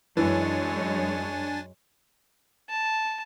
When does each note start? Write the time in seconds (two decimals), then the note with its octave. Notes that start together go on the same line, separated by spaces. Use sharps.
0.17 F#2 E3 G#3 D4 C#5 G#5 A6
2.70 A5